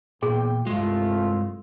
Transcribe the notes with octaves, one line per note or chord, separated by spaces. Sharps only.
E2 A#2 G#4 G5
C2 G2 G#3 A3 F4